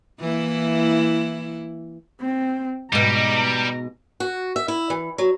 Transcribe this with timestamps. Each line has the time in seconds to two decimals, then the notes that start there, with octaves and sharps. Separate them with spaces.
0.20 E3 A#3 E4
2.20 C4
2.92 G#2 B2 G3 A#5
4.20 F#4
4.56 E5
4.68 E4
4.90 E3
5.18 F#3